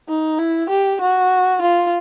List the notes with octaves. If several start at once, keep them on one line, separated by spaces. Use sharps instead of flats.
D#4
E4
G4
F#4
F4